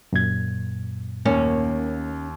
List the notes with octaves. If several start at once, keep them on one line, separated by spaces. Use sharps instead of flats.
F#2 A#2 G#6
D#2 A#3 C#4